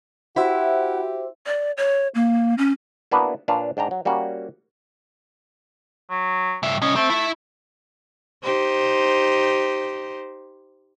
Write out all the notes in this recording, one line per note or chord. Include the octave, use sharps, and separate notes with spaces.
E4 F#4 G4 C5 E5 F#5
D5
C#5
A#3
C#4
A#3 B3 D4 E4 F#4 B4
A#2 D4 B4 C#5 F5
G#2 D4 G5 A#5
F#3
G3 A#3 C#4 F#4
F#3
G2 E5
C2 C#4 D#5
A3 C4
E4 E5
D#4 G4 C5